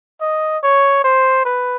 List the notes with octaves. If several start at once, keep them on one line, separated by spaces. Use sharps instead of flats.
D#5
C#5
C5
B4